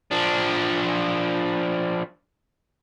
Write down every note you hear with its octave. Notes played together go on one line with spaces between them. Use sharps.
F3 D4